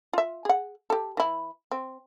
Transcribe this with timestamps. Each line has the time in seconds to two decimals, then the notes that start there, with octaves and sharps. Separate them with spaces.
0.13 F4 E5
0.45 G#4 F#5
0.90 G4 A4
1.17 E3 E4
1.71 C4